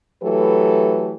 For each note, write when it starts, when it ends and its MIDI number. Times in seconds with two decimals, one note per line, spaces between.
0.23 1.16 52
0.23 1.16 54
0.23 1.16 57
0.23 1.16 67
0.23 1.16 69
0.23 1.16 71